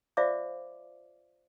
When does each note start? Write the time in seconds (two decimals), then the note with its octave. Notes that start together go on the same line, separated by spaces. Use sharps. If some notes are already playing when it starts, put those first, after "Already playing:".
0.17 F4 C5 D5 E5 F5 D6